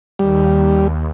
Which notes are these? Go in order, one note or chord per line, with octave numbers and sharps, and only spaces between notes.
D#2 G3